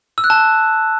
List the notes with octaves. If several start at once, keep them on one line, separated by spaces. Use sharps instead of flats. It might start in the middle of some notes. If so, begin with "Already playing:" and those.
E6
F#6
A5